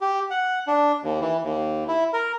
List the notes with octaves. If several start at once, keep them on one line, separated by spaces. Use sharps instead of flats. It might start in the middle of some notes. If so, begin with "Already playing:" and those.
G4
F#5
D4
D#2
E3
D#2
E4
A#4